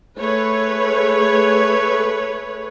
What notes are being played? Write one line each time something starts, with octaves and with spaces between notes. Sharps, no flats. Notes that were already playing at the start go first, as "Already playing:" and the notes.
A3 G#4 B4 C#5